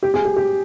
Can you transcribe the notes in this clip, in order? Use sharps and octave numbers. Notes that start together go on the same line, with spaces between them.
G4
G#4
G4
G4